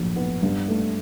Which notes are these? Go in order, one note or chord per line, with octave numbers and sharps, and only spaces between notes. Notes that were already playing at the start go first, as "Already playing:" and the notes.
Already playing: A#1 A2 F#3
B3
G2
A3